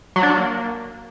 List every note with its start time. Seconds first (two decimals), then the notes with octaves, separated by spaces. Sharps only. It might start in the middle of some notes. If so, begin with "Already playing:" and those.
0.16 F#3
0.23 D4
0.30 F#3
0.37 A#3